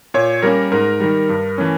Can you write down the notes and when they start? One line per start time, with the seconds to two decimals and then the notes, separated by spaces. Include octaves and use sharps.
0.14 A#2 C#5
0.42 G3 A#3 C#4 A#4
0.72 G#2 A#4
1.00 D#3 G3
1.29 G2
1.58 E3 A3 C#4